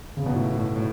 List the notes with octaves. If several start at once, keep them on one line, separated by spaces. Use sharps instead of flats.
C#3
B2
A2
A2
A2